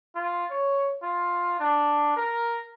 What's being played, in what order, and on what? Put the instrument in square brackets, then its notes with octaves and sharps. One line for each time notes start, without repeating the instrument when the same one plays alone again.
[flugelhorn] F4
C#5
F4
D4
A#4